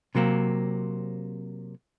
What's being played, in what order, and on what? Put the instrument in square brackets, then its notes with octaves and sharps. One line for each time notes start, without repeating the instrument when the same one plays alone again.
[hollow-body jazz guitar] C3 F#3 A#3 C4